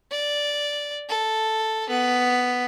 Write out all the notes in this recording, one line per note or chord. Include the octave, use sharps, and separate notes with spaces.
D5
A4
B3